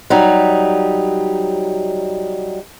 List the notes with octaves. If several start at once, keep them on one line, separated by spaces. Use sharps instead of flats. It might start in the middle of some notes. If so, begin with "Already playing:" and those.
F#3 G3 D#4